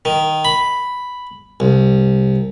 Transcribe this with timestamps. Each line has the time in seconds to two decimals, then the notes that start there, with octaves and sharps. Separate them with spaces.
0.05 D#3
0.45 B5
1.60 C2